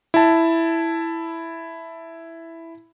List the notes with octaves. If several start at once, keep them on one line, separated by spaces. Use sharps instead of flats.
E4 A5